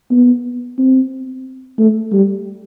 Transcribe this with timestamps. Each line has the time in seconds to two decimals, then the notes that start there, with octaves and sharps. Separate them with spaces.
0.11 B3
0.78 C4
1.78 A3
2.12 G3